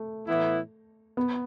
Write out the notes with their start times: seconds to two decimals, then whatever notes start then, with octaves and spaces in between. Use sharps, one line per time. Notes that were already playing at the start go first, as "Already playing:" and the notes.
Already playing: A3
0.28 A2 E3 B3 E4
1.17 B3